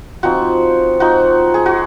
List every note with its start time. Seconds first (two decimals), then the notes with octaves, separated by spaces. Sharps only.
0.23 F3 C4 D#4 F#4
1.00 F3 C4 D#4 F#4
1.54 G#4
1.66 F#4